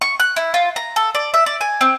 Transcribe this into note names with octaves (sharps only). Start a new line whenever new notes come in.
C#6
F#6
E4
F4
A#5
A4
D5
E5
D5
G#5
C4